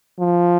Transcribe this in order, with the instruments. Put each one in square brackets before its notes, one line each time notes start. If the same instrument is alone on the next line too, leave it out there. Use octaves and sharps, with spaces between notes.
[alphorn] F3